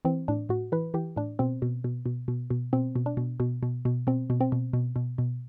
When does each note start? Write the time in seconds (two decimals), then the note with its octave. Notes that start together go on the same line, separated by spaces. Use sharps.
0.05 E3 C4
0.28 A2 D4
0.49 A2 F#4
0.72 E3 B4
0.94 E3 G4
1.16 A2 D4
1.39 B2 C4
1.62 B2
1.84 B2
2.06 B2
2.28 B2
2.50 B2
2.73 B2 C4
2.96 B2
3.06 D4
3.17 B2
3.40 B2
3.63 B2
3.85 B2
4.07 B2 C4
4.30 B2
4.41 C4
4.52 B2
4.73 B2
4.96 B2
5.18 B2